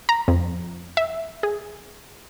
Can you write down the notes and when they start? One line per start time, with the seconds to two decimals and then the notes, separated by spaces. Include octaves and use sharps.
0.09 A#5
0.28 F2
0.97 E5
1.43 G#4